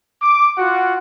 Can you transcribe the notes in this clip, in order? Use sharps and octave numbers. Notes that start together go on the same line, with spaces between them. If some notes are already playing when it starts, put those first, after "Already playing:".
D6
F4 F#4 F#5